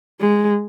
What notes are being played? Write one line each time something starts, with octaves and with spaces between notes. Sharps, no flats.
G#3